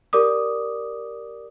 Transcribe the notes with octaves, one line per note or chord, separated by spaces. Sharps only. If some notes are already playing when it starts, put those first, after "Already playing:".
G4 A#4 D5 D6 D#6